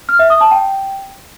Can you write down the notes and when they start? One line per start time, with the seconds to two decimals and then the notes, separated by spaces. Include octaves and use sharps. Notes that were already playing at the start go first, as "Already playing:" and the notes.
0.09 F6
0.19 E5
0.30 D#6
0.41 A5
0.51 G5